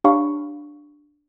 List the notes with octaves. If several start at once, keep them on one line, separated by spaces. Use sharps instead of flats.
D4 G4 C#5 F5 B5 C#6